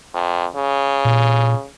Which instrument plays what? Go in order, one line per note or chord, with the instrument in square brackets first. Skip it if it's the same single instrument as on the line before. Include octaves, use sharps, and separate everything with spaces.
[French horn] F2
C#3
[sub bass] A#2